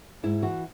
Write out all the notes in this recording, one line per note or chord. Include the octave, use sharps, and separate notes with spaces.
G#2 E4
E3 F#4